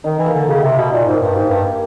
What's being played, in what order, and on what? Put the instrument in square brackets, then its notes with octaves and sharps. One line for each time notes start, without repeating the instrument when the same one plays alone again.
[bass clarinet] D#3 [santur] D#4
[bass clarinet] E3
[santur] A#3
[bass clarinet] D3
[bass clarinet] C#3 [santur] G4
[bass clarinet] C3
[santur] A#3
[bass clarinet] B2
[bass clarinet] A#2 [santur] D#4
[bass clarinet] G#2
[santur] A#3
[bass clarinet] G2
[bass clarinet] G#2 [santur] G4
[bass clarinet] G2
[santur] A#3